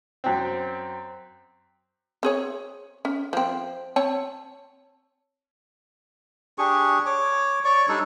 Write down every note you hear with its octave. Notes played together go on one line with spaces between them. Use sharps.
F#2 C4
C4 G#4 C#5
C#4
F3 C4
C4 C#5 A5
D4 G4 G#4 C#6
C#5 D6
C#5 D5 C#6
G3 D4 D#4 A4